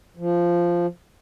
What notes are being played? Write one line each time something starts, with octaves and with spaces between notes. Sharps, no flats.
F3